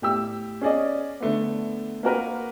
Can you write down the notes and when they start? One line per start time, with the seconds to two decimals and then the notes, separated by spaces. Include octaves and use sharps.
0.02 A2 G4 E6
0.61 C#4 G#4 D5 D#5
1.20 D3 A3 B3
2.03 A#3 F#4 A#4 B4